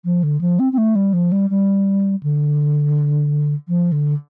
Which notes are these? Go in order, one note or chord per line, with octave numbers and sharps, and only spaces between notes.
F3
D3
F3
C4
C4
A3
G3
F3
G3
G3
D3
F3
D3